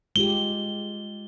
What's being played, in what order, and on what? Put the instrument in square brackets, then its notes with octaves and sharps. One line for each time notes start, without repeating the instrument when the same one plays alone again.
[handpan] G#3 F4 G4 [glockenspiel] G7